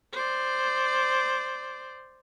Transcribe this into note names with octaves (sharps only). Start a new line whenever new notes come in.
C5 D5